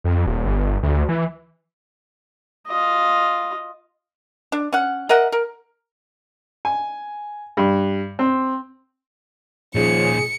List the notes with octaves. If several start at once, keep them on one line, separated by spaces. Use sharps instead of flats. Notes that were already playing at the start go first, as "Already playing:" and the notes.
F2
D#1
G1
D2
E3
F4 D#5
D4
C#4 F#5
A#4 D#5 E5 F#5
A#4
G#5
G2
C4
A#2 F3 C#4 D#4 G#4 C#7